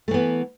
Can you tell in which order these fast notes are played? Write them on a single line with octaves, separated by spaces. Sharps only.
A3 E3 B3